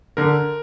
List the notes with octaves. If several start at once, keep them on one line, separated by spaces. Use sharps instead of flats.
D3 A#4